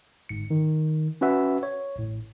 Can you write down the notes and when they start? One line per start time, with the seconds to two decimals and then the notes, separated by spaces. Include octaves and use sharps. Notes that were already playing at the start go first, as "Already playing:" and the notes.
0.29 G1 G#2 C#7
0.50 D#3
1.21 C#4 F#4 B4 E5 F#5
1.63 C#5
1.96 A1 A2